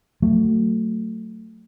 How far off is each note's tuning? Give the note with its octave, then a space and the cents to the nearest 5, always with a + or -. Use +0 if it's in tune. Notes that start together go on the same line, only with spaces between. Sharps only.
F#3 +0 A3 +20